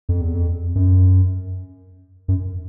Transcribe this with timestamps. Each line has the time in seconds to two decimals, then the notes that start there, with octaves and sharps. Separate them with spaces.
0.09 F2
0.21 E2
0.34 F2
0.75 F#2
2.28 F#2